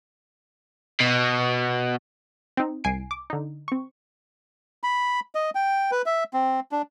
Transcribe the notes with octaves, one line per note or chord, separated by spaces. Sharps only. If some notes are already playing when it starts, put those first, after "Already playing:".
B2
C4 D#4
C2 G#5 C7 D7
D6
D3 D#4
C4 C#6
B5
D#5
G5
B4
E5
C4
D4